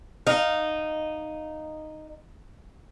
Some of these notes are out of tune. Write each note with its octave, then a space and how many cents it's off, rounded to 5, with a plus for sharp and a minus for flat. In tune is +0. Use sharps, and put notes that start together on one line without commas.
D#4 -10 F5 +0